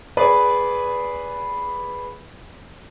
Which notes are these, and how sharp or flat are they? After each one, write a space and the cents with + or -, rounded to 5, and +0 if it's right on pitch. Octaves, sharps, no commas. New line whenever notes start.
G#4 +0 B4 +0 D5 -20